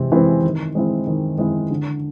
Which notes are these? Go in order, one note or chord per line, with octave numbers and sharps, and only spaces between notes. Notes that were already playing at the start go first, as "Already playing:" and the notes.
Already playing: C3 E3 G#3 C4
E3 G#3 C4 E4
D#3
G#3 C4 E4
D#3
G#3 C4 E4
D3